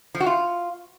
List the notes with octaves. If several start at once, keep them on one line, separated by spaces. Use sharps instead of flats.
F3
F#4
F4